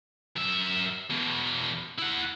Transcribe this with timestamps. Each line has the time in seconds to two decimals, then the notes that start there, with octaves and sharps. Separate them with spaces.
0.36 F#2 E5
1.10 E2 B2
1.99 E4 F#5